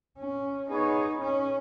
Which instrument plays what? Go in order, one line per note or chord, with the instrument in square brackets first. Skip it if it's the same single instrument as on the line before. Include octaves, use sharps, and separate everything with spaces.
[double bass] C#4
[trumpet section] B3 G#4 C#5 [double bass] D#4
[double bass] C#4